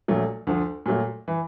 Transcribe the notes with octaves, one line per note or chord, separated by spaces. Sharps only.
A#1 A#2 F#3 A3
D2 D3 F3
A#2 F#3 A3
E3